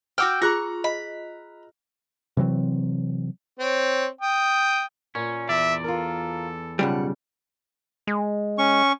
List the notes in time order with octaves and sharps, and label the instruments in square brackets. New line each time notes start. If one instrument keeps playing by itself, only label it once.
[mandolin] F#4 F#5 G5 [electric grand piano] D6 E6 F6
[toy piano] F4 G#4 [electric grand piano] A#5 F#6 A#6 [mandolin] C#6
[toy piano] D#5 [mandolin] B5
[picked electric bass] C3 E3 F#3 C4
[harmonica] C4 C#5
G5 D#6
[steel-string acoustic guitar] A#2 [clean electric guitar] C#4
[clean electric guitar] E2 D5 [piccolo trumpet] E5
[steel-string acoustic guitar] F4 A#4 [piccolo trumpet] A4
[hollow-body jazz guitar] B1 C#3 G3 [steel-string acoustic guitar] F2 F#5
[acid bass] G#3
[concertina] C#4 C#6